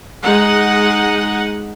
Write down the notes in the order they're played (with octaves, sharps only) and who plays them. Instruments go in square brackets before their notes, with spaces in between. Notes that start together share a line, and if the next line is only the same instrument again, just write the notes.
[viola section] G#3 D#4 F#5